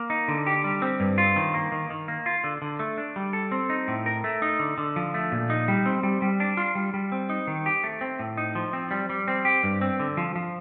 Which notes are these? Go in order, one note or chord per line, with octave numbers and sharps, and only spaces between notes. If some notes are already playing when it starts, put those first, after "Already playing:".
Already playing: A#3
D#4
D3
G4
G3
C4
G2
F4
D#3
A#3
D#3
D#3
A#3
F4
D3
D3
A3
D4
G3
A4
C4
D#4
A2
A#4
A3
D#4
D3
D3
F3
A3
A#2
D#4
G3
C4
G3
G3
D4
F4
G3
G3
C4
D#4
D#3
G4
A3
C4
A2
D#4
F3
C4
G3
G3
C4
G4
G2
C4
D3
F3
F3